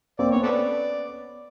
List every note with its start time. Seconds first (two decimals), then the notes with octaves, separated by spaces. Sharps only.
0.19 A#3 C4 D5
0.31 B3 C#4 C#5
0.43 A4 B4 D5